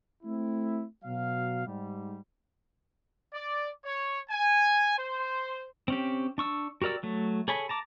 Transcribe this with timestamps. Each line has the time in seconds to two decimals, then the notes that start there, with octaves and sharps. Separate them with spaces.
0.23 A3 C4 E4
1.04 B2 F#3 F5
1.66 G#2 G3
3.34 D5
3.85 C#5
4.30 G#5
4.98 C5
5.88 C4 C#4 G4
6.38 D4 C#6 E6
6.82 F#4 G4 A#4 D5 E6
7.03 F#3 A3
7.48 G#4 A4 C#5 G#5 B5
7.69 A5 A#5 D6